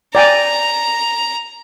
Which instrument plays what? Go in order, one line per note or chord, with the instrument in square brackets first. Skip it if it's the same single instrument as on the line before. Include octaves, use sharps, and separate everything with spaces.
[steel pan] D5 G5 G#5 [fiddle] A#5